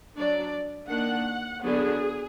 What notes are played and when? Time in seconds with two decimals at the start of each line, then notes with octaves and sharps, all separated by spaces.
0.16 F#3 D4 D5
0.89 D#3 A#3 D4 F#5
1.63 D3 F#3 B3 D4 G#4